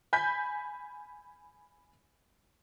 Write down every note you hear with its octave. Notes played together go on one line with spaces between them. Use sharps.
G#5 B5 G6 B6